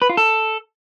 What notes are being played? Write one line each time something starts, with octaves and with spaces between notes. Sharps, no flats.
B4
F4
A4